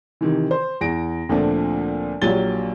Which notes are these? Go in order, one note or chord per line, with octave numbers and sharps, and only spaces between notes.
C3 D#3 E3
C5
E2 A#6 D7
D2 A#2 F3 A3 C4 D4
A#1 F#3 F4 G4 A6 G7